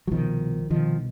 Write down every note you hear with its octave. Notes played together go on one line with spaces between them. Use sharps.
F#3
C2 B2 D#3 F3
C2 B2 D#3 F3